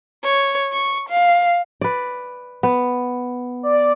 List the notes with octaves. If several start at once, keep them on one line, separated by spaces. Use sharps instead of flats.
C#5
C#6
F5
B4 D5
B3
D5